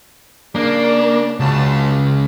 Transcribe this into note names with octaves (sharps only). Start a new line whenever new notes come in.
C#3 A#3 D4
C#2 C#3 F#4 A5